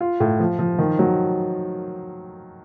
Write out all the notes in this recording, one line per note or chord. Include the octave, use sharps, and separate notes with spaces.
F4
A2
F3
F3
D#3
F#3